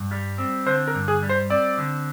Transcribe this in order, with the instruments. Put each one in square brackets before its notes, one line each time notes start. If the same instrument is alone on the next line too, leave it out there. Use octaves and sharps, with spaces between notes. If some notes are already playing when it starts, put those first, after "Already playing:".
Already playing: [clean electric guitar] G2
G3
C4
[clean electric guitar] D3 [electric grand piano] C5
[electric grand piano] A#4
[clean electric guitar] G2
[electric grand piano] G#4
[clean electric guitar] G3
[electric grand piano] C5
[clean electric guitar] C4 [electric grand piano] D5
[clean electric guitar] D3